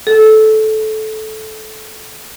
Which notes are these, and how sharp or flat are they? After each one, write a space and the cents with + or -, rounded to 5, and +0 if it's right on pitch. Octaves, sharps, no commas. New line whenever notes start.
A4 -15